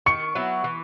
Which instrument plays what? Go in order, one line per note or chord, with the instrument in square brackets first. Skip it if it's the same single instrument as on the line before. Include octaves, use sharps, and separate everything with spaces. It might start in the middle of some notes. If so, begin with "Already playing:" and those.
[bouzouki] D#3 [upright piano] C#6 C#7
[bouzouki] F#3 B3 E4
E3